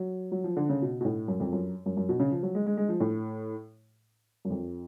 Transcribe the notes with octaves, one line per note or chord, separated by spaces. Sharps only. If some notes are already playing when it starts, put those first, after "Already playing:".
Already playing: F#3
F#3
F3
D3
C#3
B2
B2
A2
F#2
F2
F#2
F#2
F#2
B2
C#3
F3
F#3
G#3
G#3
G#3
F3
A2
F#2
F2